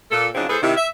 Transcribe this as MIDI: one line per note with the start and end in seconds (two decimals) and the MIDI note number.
0.11 0.28 46
0.11 0.28 69
0.35 0.45 49
0.35 0.45 53
0.35 0.45 54
0.35 0.45 60
0.35 0.45 62
0.35 0.45 63
0.49 0.57 45
0.49 0.57 68
0.49 0.57 69
0.49 0.57 71
0.49 0.57 72
0.62 0.73 48
0.62 0.73 51
0.62 0.73 64
0.77 0.86 76